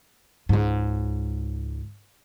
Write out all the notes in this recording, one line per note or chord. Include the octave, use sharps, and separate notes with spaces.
C#2 G#2